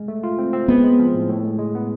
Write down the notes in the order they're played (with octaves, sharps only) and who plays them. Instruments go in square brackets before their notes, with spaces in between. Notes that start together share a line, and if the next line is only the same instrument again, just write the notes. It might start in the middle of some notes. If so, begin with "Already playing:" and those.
Already playing: [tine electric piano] G#3
A3
F4
C4
C4
[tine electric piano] G#3 [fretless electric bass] B3
[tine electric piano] G#3
F3
A2
A2
G#3
G#3
B3